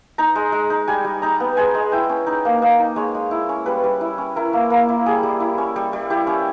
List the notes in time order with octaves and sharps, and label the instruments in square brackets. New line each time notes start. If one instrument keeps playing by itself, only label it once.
[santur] D#4 A#5
G#3
G#3
D#4
G3 G#5
G3
D#4 A#5
B3
G#3 G#5
G#3
E4 G5
C#4
D#4
A#3
A#3 D#5
D#4
G#3 C#5
G#3
E4
C#4
G3 B4
G3
E4
C#4
E4 A#4
A#3
A#3
E4
G3 G#4
G3
E4
C#4
G3
G3
E4 G4
C#4